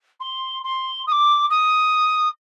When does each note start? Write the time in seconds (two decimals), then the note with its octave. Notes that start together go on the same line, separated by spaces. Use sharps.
0.20 C6
0.64 C6
1.07 D#6
1.12 D6
1.50 D#6